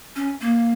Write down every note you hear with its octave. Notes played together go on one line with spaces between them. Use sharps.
C#4
A#3